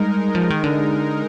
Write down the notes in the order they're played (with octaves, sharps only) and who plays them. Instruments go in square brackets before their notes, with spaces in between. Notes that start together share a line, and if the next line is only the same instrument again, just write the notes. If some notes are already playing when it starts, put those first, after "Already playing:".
Already playing: [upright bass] G3 [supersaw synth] G#3 D#4 A#4
[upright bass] F3
D#3
D3